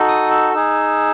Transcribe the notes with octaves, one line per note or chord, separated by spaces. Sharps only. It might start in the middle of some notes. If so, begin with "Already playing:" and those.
Already playing: D#4 F#4 A4
D#6
E6
D#4 G#4 E6